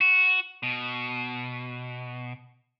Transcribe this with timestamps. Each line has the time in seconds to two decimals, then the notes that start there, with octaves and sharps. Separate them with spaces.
0.01 F#4
0.63 B2